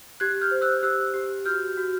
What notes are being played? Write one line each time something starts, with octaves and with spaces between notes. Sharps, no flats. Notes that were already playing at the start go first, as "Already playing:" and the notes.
G4 F#6 G#6
F6 G6
C5
E6 F#6
G4 E6 F#6
G4
F#4 F6 G6
F#4